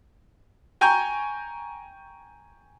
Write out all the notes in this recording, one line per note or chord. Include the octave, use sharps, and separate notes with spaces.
G5 G#5 A#5 C#6 G6